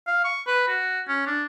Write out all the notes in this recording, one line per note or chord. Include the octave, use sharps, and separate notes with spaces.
F5
C#6
B4
F#4
C#4
D4